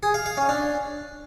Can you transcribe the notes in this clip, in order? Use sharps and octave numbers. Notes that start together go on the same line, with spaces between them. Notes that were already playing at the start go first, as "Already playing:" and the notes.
G#4
F5
F5
C#4
D4